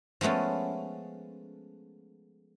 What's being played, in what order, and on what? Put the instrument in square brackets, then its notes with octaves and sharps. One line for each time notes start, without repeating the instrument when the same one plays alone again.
[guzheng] F3 G#3 A3 B3 C#4